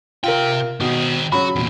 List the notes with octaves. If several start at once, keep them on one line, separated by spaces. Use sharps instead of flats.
C3 F4 A#4 G5
B2 D#3 C4
C#3 F#3 F#4 B5
E2 A#2